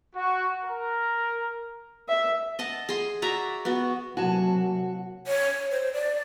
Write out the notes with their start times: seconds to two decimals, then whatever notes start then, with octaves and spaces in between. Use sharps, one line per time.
0.15 F#4
0.64 A#4
2.09 E5
2.59 D#5 F#5 A5
2.89 G#4 C6
3.22 F#4 D5 E5 A#5
3.65 B3 F#4
4.17 C3 F#3 A#3 F#4 G#5 A5
5.27 C#5
5.71 C5
5.93 D5